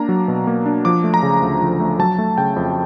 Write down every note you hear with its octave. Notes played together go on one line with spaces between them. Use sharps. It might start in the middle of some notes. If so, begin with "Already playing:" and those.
Already playing: A#3 D4 A#5
F#3
B2
A#3
D4
F3 D6
A3
A#5
C#3
D2
F3
A3
F#3 A5
A3
C#3 G5
F2